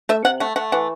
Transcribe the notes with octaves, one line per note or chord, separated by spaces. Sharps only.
A3 E5
C3 F#5
A3 F#5
A3 F#5
E3 F#5